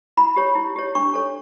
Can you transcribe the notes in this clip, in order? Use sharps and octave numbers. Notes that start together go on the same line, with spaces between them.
E4 B5
G4 C#5
E4
G4 C#5
D4 C#6
A4 C#5